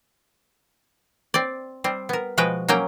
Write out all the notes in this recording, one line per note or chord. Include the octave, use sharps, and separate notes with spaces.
C4 D5
G3 C4
B3 A#4
B2 F3 G#3 F#4 B4 G5
F#3 A#3 C#4 A#4 G5